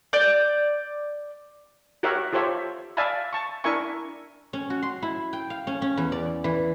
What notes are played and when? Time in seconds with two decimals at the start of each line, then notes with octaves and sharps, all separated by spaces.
0.13 D5 D6 G6
2.03 F#4 G4 A#4 C#5 E5 F#5
2.33 F4 G4 A4 C5 C#5 E5
2.97 D5 E5 F5 G#5 A5 B5
3.33 A5 C#6
3.64 D4 E4 A#4 E5 G#5 C#6
4.53 C#4
4.70 F#4
4.82 C6
5.02 E4
5.33 G5
5.50 F5
5.67 C#4
5.82 C#4
5.97 E2
6.12 D5
6.44 E3